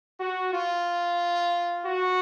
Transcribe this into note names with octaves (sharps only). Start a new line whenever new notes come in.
F#4
F4
F#4